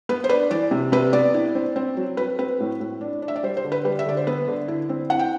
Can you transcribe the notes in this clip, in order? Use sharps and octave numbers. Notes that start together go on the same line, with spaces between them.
B3 B4
C5
D4 B4
E3 D5
C3
C3 B4
B3 D5
E4
C4
C4
F#3
F#3 B4
C4 B4
A2
A2
D4
D4
E5
D5
G3 C5
C5
D3
B4
G3 B4
E5
D3 D5
C5
B3 B4
D3
E4
C4
E4 F#5
G5